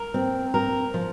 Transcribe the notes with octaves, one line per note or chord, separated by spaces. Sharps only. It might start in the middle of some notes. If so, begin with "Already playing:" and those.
Already playing: A#4
C4
A#4
F3